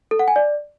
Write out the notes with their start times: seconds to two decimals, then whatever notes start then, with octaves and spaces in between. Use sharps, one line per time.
0.11 A4
0.19 F#5
0.28 G#5
0.36 D5